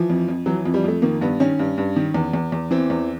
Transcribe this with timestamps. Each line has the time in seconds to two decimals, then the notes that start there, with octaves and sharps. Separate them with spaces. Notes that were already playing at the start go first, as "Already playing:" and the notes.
Already playing: E3 F3
0.10 F2
0.28 F2
0.46 E3 F#3
0.65 F2
0.74 G3
0.84 F2 A3
1.02 D#3 A#3
1.21 G2 B3
1.40 D#3 C#4
1.59 G2
1.78 G2
1.96 D#3
2.14 E2
2.33 E2
2.52 E2
2.71 E3 C4
2.90 E2